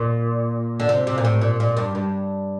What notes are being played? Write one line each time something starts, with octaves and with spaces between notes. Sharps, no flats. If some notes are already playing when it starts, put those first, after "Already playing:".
Already playing: A#2
D3
C3
C3
A#2
A2
A#2
A#2
G2
G2